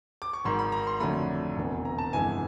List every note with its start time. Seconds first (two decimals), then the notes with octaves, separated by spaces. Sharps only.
0.22 D6
0.33 C#6
0.44 G#1 G#2 D#3 C6
0.59 B5
0.72 A#5
0.87 C6
1.00 F2 D3 F#3 A3 B5
1.57 E1 E2 C3
1.85 A#5
1.98 A5
2.13 G1 F2 C3 E3 G#3 G#5